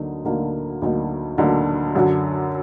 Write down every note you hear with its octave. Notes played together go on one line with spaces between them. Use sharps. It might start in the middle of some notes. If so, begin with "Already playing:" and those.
Already playing: D2 D3 F#3 A#3 D#4
D2 D3 F#3 A#3 D#4
D2 D3 F#3 A#3 D#4
D2 D3 F#3 A#3 D#4
F#2 D3 F#3